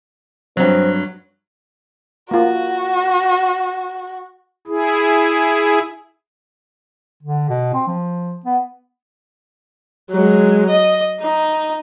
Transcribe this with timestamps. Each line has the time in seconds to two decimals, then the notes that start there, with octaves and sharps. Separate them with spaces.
0.57 G2 F#3 C4
2.31 A#3 F4 F#4
4.67 E4 G#4
7.22 D3
7.49 B2
7.73 C4
7.87 F3
8.45 B3
10.10 F#3 G#3
10.69 D#5
11.20 D#4